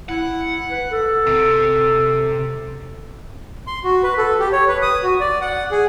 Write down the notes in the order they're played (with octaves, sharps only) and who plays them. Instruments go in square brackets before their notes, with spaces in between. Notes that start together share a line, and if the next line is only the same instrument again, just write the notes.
[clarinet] E4 [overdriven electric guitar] F#5
[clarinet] B4
A4
[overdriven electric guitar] C3
[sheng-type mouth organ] C6
F#4
B4
A4
G4
C#5
B4
D#6
F#4
D5
F#5
G#4